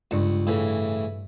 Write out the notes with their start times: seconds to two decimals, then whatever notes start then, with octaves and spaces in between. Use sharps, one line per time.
0.11 C#2 G2 C#7 E7
0.47 A2 C#3 E3